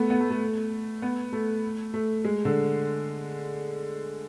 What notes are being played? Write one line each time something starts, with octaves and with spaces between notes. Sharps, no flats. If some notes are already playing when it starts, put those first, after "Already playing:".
Already playing: A3 B3
B3
A3
A3
B3
A3
A3
G#3
D3